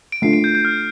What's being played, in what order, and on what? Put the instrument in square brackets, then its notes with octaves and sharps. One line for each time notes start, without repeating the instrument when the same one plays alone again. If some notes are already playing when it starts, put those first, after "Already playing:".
[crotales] D7
[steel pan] A3 D4 F4 [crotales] C7
[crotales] D7
G6
G6
F6